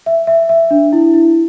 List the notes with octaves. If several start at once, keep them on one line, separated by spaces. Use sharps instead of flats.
E5
E5
E5
D4
E4
E4